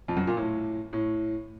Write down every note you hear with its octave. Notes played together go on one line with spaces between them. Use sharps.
F2
F#2
A#2
A2
A2